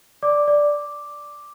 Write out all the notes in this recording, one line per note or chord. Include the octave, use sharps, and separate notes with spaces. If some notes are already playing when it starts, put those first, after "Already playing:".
D5 D6
D5